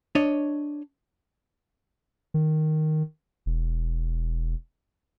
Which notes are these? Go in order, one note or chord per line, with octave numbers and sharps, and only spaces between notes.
D4 C#5 D#5
D#3
E1